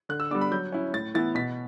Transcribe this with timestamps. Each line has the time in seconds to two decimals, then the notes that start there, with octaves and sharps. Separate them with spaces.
0.09 D3 F#6
0.20 E6
0.31 G3 B3 D4 D6
0.41 B5
0.51 F#3 G6
0.72 C#4 E4
0.93 A2 A6
1.14 E3 B3 E4 A6
1.35 B2 B6